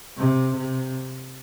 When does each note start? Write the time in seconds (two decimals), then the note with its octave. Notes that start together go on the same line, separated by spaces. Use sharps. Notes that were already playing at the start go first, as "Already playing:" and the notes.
0.17 C3
0.56 C3